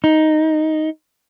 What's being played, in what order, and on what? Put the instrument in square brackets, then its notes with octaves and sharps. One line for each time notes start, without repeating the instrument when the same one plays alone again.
[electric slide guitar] D#4